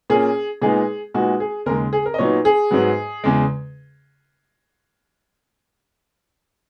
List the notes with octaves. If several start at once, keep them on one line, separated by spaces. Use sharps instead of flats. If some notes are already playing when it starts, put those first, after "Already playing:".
A#2 A#3 C#4 G#4
A#2 G#3 B3 D#4 G#4
A#2 G#3 B3 D#4 F#4
G#4
D#2 C#3 G#3 A#4
G#4
A#4
D#5
A#2 F#3 B3 D#4 C#5
G#4
G#2 F#3 B3
E2 C#3 G#3